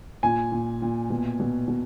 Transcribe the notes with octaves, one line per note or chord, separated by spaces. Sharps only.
A#2 G#5
A#2
A#2
B2
B2
B2